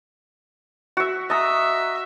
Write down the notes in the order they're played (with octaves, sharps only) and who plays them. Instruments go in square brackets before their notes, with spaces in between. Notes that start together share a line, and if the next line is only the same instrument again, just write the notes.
[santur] F#4 E5
[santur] D#5 A#5 [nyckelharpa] E5